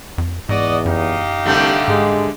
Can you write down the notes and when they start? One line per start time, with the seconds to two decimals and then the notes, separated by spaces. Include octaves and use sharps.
0.18 F2
0.49 E2 G#2 F#4 D5 D#5
0.85 F#2 D#4 G4 F5
1.45 C2 D3 G3 A3
1.88 G#2 G#3